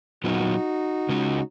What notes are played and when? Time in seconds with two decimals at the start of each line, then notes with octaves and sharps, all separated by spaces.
0.24 A#2 F#3 B3 D#4 F4 F#4
1.09 C#3 G#3 C#4 F4